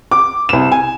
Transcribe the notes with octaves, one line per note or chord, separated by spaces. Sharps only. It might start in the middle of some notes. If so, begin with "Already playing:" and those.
D6
C2 E7
G#5